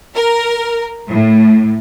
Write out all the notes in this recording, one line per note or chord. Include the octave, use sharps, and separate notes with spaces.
A#4
A2